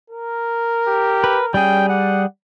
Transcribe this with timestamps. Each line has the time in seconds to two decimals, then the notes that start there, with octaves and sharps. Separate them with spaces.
0.10 A#4
0.88 G4
1.24 B4
1.54 G3 C#4 G#4 G5
1.89 D5 F#5